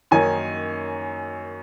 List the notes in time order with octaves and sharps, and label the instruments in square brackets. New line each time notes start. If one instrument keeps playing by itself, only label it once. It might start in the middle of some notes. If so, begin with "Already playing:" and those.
[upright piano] F#2 D#3 A#3 D#4 G#5